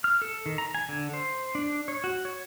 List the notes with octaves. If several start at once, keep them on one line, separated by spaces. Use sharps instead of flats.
F6
A4
D#3
A#5
G#5
D3
C5
D4
C#5
F#4
C#5